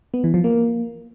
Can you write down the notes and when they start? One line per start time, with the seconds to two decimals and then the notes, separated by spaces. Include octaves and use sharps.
0.14 B3
0.24 E3
0.34 F3
0.44 A#3